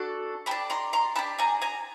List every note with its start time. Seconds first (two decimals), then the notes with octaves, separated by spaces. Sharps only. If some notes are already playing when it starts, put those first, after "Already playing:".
Already playing: D4 F#4 A4
0.46 D4 G4 A5 B5
0.70 A#5 C6
0.93 A#5 C6
1.16 D4 G4 A5 B5
1.39 G#5 A#5
1.62 G#5 A#5